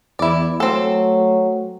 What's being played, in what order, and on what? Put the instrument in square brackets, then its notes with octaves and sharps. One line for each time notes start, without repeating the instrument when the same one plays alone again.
[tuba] E2 [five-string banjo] E4 D5
[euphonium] F#3 [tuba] A3 [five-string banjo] C4 A4